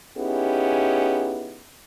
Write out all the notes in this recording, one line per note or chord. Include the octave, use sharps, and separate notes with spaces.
B3 C#4 D#4 E4 G4 G#4